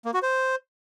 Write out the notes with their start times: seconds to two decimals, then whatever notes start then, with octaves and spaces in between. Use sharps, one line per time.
0.05 A#3
0.14 F#4
0.22 C5